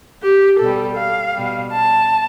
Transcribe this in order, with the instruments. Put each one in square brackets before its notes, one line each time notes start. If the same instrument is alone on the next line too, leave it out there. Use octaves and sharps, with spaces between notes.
[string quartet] G4
B2 G3 A4
F5
B2 G3
A5